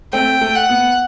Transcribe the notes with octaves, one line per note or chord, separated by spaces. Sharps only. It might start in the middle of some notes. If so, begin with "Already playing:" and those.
A3 C4 G5
A3
F#5
B3